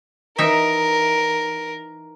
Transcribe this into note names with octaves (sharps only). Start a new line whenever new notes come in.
E3 D#4 A#4 E5